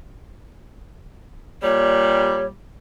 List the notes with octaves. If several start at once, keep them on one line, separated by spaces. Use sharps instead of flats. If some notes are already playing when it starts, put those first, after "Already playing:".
A#2 G3 C#5